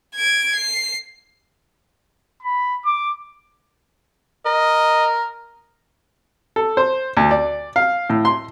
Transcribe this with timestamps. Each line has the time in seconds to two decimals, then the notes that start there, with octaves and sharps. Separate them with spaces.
0.15 G#6 D7
0.55 C7
2.42 B5
2.85 D6
4.46 A#4 D#5
6.56 A4
6.77 C5
7.17 D2
7.31 D5
7.76 F5
8.10 A2
8.25 C6